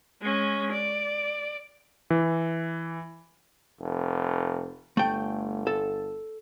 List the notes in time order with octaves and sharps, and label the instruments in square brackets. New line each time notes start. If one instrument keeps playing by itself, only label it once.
[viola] G#3 C#4
D5
[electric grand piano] E3
[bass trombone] F1
[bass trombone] G1 [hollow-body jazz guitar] A3 G5
[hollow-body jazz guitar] A4